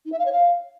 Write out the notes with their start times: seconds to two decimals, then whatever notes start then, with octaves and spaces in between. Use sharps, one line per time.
0.05 D#4
0.12 E5
0.19 F5
0.25 C#5
0.32 F5